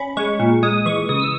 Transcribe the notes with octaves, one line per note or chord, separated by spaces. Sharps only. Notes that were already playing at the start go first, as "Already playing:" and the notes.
Already playing: C#4 B5
G#3 C#6
A#2
G#3 D#6
E3 C#6
C#3 D#6
E6